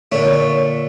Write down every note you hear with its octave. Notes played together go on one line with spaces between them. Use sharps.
A#2 D3 A3 C#5